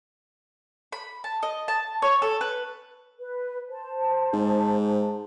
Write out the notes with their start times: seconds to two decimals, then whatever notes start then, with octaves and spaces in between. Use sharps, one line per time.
0.92 B5
1.24 A5
1.43 D#5
1.68 A5
2.02 C#5
2.22 A4
2.41 B4
3.19 B4
3.69 C5 A5
4.33 G#2